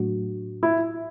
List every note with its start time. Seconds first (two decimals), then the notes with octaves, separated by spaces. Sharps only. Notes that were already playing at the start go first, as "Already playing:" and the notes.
Already playing: A2 F#3 A3 D4 F#4
0.63 E4